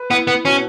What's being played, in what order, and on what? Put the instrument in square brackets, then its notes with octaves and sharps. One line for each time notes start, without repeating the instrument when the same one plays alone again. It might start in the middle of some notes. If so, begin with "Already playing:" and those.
Already playing: [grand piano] B4
[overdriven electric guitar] B3 [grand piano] E4
[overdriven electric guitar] B3
[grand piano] B2 [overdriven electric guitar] C#4